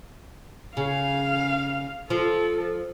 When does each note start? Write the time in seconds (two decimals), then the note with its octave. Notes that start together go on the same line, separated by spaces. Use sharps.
0.77 C#3 F5
2.10 F3 A4